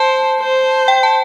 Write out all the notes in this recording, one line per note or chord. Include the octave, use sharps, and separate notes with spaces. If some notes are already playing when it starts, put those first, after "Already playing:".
Already playing: C5 A5
C5
G5
A5